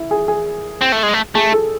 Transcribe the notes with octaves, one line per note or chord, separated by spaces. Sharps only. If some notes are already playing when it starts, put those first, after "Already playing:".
Already playing: E4
G#4
G#4
C4
A3
G#3
A3
A3 G#4
A4